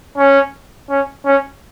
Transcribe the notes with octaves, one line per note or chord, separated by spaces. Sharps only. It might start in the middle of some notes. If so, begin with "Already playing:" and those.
C#4
C#4
C#4